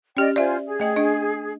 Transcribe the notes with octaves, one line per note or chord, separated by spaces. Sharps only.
C#4 G4 D5 D#5 G5
F4 C5 D5 E5 G#5
G#4
A3 D#5 G5
D4 D#5